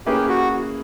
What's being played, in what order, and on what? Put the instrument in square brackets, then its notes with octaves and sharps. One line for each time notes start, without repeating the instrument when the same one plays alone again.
[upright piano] A#3 C#4 E4 G#4 B4 [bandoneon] G4
[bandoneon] F#4